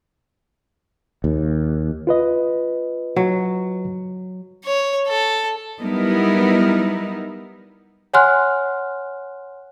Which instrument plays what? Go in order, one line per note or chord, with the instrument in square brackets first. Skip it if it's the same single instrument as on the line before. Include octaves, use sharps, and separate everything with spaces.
[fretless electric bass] D#2
[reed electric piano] F4 B4 D#5
[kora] F#3
[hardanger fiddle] C#5
A4
[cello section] F#3 G3 B3 D#4 E4 A#4
[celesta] C#5 F#5 G#5 C6 F6 F#6